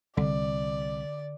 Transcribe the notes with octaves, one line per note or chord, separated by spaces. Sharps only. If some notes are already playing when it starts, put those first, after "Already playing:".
C2 D3 D5